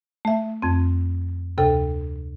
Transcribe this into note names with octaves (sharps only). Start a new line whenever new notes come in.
A3 E5
F2 C4
D2 C3 A4 G5